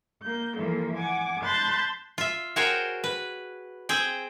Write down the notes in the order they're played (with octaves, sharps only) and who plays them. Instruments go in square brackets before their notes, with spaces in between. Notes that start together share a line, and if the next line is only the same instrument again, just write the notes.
[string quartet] A#3 G6
E3 F3 G3 A#3 A4
F#5 G#5 D6
A5 B5 C6 F#6 G6 A6
[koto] F4 E5
F#4 G#4 A#4 C5 C#5 G5
B4
C4 G#4 G5